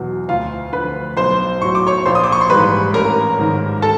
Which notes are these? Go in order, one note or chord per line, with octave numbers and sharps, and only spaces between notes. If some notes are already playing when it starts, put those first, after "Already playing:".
Already playing: E2 B2 F#3
D2 F4 F5
D3 F3 B4 B5
B1 C5 C6
A2 F#3 C#6
D6
C#5 C#6
A#1 C5 C6
D#6
D6
C#6
C6
G#2 E3 G3 B4 B5
A1 A#4 A#5
G#2 D#3
A4 A5